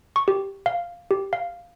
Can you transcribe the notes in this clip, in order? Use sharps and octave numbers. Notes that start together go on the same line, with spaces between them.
C#6
G4
F5
G4
F5